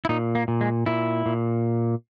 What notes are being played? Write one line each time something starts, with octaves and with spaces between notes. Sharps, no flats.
E4
A#2 D#4
A#3
A#2
G#3
A#2 E4
A#2